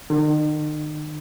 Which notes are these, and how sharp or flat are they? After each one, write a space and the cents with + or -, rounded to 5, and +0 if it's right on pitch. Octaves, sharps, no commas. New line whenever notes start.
D#3 -40